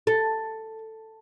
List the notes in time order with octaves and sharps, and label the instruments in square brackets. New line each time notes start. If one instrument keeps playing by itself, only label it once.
[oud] A4